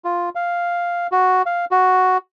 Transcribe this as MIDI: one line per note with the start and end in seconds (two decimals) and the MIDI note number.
0.05 0.29 65
0.35 1.07 77
1.12 1.42 66
1.46 1.65 77
1.71 2.17 66